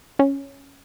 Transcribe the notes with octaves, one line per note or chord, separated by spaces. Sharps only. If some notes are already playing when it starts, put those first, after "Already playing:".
C#4